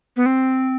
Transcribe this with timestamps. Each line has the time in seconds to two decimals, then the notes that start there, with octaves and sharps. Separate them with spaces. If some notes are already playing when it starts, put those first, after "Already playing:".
0.17 B3
0.26 C4